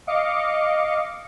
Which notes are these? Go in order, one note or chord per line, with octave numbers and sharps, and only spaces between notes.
D#5 F5 D6 C#7